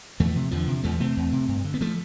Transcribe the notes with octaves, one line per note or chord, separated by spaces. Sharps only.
E2 F3 A3
C3
E2 D3 F3
C3
E2 F3 A3
C3 A3 C4
E2
C3
G2
D3
B3
F3 A3